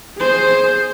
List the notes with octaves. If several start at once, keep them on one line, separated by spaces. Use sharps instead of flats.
G#4 C5